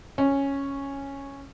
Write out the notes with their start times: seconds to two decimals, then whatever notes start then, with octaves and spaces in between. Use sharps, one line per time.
0.18 C#4